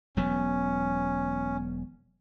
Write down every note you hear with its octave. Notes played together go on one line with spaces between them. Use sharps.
E1 F#3 B3 C#4